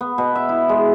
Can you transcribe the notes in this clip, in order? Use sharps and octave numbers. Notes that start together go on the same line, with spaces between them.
B3
B2
E5
E4
G#3